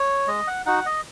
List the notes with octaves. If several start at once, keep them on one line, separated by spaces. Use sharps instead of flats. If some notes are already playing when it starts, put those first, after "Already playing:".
Already playing: C#5
G#3 D#5
F#5
D#4 F#4 F#5
D#5